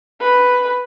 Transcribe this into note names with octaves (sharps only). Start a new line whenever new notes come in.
B4